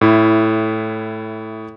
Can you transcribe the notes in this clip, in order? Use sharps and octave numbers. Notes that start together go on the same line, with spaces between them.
A2 E4